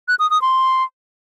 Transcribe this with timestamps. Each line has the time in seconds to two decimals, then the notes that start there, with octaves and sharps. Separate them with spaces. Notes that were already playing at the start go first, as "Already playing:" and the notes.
0.08 F#6
0.19 D#6
0.31 D#6
0.42 C6